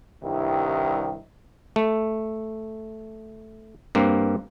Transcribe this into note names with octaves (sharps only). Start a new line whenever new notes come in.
C2 G2 D#3 E4
A3
G2 A#3 C4